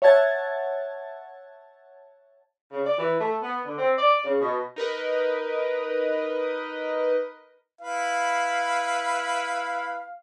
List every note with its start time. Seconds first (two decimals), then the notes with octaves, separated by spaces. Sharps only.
0.02 C#5 E5 F#5 A5 G#6 A6
2.72 C#3
2.86 D5
2.98 E3
3.20 A3
3.42 B3
3.65 D3
3.78 C4
3.98 D5
4.25 C#3
4.40 B2
4.76 D#4 A#4 B4 D#5
7.81 E4 B4 F5